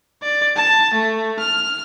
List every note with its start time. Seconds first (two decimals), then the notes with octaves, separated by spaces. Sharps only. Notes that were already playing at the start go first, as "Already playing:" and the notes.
0.23 D5
0.56 A5
0.94 A3
1.40 F6